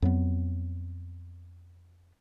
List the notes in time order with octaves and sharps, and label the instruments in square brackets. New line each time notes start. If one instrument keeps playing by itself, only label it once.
[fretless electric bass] F2 F#3 B3